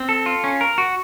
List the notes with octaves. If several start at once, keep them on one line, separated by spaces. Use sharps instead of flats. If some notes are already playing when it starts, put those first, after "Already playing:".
Already playing: C4
A4
F4
C#4
A#4
F#4